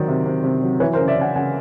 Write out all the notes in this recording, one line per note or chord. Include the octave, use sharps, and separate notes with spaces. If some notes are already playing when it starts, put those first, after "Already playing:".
Already playing: D#3 F#3 C5 D5
C3
C3
C3
F#3
E3 B4 C#5
A#4 C5
C#3
D5 E5
C#3 F#5 G#5
C#3 F#5 G#5